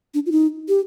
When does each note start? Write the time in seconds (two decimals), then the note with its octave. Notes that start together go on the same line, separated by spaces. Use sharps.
0.14 D4
0.26 F4
0.32 D#4
0.68 G4